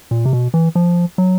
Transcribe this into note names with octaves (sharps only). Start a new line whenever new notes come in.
A#2
C3
B2
E3
F3
F#3